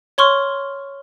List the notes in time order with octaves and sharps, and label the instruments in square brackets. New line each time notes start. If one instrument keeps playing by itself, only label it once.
[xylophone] C#5 C6 C#6 F6